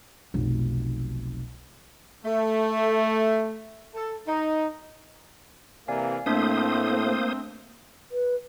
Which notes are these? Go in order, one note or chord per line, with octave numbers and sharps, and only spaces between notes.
F1 B1
A3
A4
D#4
C3 E3 A#3 D5 F5 G#5
A2 A3 A#3 C4 D4 C5 D#6 B6
B4